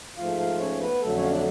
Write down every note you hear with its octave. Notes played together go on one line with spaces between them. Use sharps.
G#2 F3 A3 F4 F5
F4 F5
C#4 C#5
B3 B4
F2 D3 F#3 A3 A4
C#4 C#5
F5
D4 D5